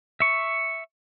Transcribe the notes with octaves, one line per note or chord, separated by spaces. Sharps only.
E5 C#6